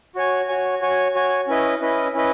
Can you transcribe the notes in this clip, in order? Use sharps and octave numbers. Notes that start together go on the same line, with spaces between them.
F#4 C#5 G#5
F#4 C#5 G#5
F#4 C#5 G#5
F#4 C#5 G#5
C#4 E4 B4 D#5
C#4 E4 B4 D#5
C#4 E4 B4 D#5